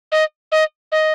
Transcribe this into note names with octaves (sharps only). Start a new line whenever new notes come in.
D#5
D#5
D#5